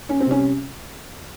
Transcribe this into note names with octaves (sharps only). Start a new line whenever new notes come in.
C#4
C4
C3 G3 C#4